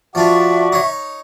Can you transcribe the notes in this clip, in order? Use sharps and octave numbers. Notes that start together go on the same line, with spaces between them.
F3 D4 F4 F#4 D5 E5 C#6
D#4 C#5